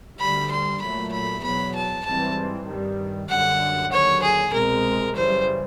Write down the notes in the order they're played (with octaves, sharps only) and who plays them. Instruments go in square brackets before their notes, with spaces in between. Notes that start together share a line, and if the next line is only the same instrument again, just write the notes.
[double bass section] D2 D3 G3 [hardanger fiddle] B5
[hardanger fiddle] C6
[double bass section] A#2 F#3 A3 [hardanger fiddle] B5
[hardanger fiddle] B5
[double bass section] E2 B2 F#3 [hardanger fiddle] B5
[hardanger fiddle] A5
[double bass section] G#2 E3 G3 C4 [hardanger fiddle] A5
[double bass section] G2 D#3 G3
[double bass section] F#2 D3 G3 [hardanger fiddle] F#5
[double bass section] D#2 D3 F#3 [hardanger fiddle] C#5
[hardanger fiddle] G#4
[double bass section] C2 B2 G#3 C4 [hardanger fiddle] A#4
[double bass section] F#2 C#3 E3 G3 [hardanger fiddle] C5